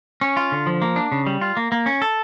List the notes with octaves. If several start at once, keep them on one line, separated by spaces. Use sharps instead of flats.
C#4
F4
D3
F3
A#3
D4
C#3
G3
F4
A#3
A#3
C#4
A4